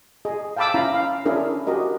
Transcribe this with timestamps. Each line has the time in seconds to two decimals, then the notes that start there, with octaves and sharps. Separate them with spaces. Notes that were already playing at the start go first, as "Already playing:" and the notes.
0.25 G#4 D#5
0.57 F5 G5 A5 B5 D6 E6
0.74 C#4 E4 F5 A#5 B5
0.94 F5
1.25 C#4 D4 E4 G#4 A#4
1.67 F#4 G4 A#4 D#5